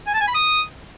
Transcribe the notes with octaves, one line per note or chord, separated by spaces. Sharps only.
G#5
A5
G#5
B5
D#6